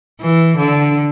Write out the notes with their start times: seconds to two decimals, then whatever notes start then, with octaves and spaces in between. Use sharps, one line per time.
0.21 E3
0.57 D3